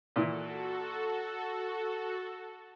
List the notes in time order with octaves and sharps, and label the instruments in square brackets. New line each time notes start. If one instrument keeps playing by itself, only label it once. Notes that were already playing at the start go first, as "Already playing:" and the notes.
[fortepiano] A#2 E3 [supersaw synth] F#4 A4